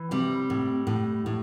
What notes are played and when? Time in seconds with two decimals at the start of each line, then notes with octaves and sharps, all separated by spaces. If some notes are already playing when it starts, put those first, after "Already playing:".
Already playing: E3
0.11 C3 G3
0.50 A2
0.87 A2
1.26 A2